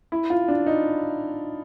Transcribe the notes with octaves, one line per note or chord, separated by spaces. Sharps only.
E4
F4
D4
D#4